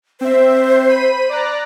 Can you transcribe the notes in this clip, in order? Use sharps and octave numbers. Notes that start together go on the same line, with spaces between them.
C4 C5 E5
B5 B6 D#7
D5 A#5 F#6